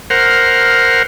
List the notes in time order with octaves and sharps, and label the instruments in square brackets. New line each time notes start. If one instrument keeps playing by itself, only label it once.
[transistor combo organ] A#4 C5 F#5 F6